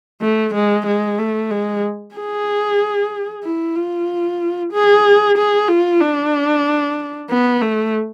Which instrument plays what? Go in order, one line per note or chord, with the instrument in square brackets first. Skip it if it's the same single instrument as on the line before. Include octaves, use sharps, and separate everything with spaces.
[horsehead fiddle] A3
G#3
G#3
A3
G#3
G#4
E4
F4
G#4
G#4
F4
D4
B3
A3